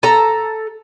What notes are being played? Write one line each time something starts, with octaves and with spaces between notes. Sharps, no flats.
A4 A#5